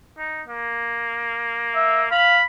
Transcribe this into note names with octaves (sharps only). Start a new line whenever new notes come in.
D#4
A#3
E5
F5 B5